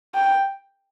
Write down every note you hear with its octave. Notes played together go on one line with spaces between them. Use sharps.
G5